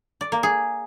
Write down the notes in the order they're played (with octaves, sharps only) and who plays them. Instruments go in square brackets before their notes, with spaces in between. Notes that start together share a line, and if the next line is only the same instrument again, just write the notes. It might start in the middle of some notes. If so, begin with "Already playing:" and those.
[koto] D5
A#3
G#4